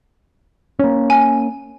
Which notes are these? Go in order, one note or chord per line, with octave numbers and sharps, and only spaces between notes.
A#3 C#4
G#5